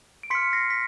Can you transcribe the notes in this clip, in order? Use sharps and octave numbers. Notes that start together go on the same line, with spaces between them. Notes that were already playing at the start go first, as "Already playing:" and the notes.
D7
C6 F6 B6 C#7
A#6 C7
B6